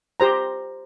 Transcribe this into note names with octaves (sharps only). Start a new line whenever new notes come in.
G4 C5 A#5